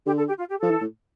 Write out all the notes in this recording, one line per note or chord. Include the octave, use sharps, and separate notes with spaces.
D3 G4
A4
G4
F4
G4
F3 A4
E3
A2